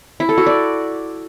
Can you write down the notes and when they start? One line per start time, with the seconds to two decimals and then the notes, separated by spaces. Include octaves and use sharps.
0.20 E4
0.29 A4
0.38 F#4
0.46 D5